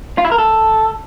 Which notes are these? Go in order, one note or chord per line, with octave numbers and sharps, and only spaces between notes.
F4
E4
A#4
A4